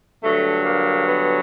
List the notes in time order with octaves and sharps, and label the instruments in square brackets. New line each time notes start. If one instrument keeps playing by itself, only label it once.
[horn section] G2 D3 F#3 A3
A#3
B3